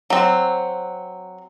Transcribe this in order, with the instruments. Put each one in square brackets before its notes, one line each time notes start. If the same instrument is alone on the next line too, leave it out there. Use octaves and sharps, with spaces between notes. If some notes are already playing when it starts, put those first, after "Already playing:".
[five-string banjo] F#3 C4